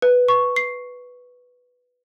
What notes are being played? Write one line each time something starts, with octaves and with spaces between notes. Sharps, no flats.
B4
C#6
C7